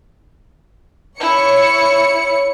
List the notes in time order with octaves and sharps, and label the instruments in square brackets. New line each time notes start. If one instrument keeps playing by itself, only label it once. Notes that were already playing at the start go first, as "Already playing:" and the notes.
[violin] E4 [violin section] C#5 C#7